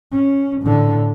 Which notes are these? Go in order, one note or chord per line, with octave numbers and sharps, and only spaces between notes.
C#4
A2 D3